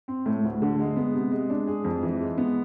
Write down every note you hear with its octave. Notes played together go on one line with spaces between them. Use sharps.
C4
A2
D2
D3
G#3
B3
C3
G#3
D4
G#4
F2
E3
G#3
B3